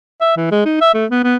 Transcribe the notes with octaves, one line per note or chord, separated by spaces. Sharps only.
E5
E3
G#3
D#4
E5
A3
B3
B3